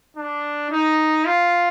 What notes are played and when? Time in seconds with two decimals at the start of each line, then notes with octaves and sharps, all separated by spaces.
0.17 D4
0.71 D#4
1.26 F4